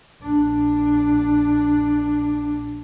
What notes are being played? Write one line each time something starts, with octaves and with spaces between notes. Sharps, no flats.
A#1 D4